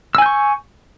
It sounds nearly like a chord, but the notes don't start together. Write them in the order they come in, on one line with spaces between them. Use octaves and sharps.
E6 G#5 G6 C#6